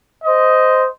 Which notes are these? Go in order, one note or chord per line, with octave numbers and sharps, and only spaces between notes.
C5 D#5